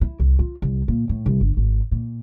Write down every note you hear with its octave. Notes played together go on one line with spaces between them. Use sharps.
E4
C2
F4
C2
A#2
A2
C2
G1
G#1
A#2